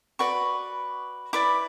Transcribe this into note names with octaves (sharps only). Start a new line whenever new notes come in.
F#4 B4 D5 C#6
E4 B4 D5 D6